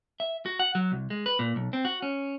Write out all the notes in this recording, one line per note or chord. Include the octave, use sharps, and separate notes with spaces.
E5
F#4
F#5
F#3
C2
G#3
B4
A#2
B1
C4
F#4
C#4